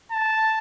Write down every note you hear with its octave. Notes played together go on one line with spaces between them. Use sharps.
A5